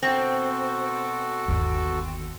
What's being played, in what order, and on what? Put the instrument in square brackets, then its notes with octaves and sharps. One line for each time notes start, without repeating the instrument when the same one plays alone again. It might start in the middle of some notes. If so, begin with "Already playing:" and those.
[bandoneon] B2 F#4 A4 [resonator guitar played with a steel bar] C4
[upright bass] G1 D#2